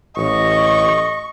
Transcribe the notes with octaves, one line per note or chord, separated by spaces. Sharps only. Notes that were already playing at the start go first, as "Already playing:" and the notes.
A1 D#5 C#6